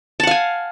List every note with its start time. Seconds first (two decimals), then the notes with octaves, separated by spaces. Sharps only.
0.20 A5
0.23 F#5
0.27 F5
0.31 G#5